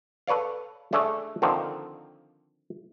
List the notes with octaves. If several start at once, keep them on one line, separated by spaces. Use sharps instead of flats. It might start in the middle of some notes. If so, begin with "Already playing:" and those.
A4 B4 C#5 D5 F5
A3 D4 G#4 A4 C#5 E5
D3 D#3 F3 C4